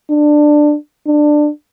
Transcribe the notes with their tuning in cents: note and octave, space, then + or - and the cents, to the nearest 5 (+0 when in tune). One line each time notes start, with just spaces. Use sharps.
D4 +15
D4 +20